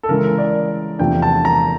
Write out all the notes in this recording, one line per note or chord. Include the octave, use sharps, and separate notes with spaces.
A4
C#3 E3 G#3 A#4
A#4
D5
E2 C3 F3 A3 D4 G5
A5
A#5